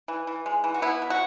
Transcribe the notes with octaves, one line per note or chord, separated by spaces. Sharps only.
E3
E3
G#3
E3
F#4
B3 E4
B2
F#4